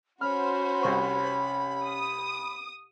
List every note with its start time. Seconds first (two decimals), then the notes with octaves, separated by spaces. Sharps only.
0.21 C#4 F#4 C5 B5 F6
0.83 C2 C3 C#6
1.85 D#6